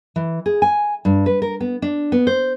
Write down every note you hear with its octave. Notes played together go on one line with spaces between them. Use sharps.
E3
G#4
G#5
G2
B4
A#4
B3
D4
B3
C5